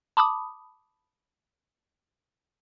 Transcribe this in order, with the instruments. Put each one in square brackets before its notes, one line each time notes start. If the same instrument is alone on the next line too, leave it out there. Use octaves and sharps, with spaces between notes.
[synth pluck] A5 B5 D6 D#6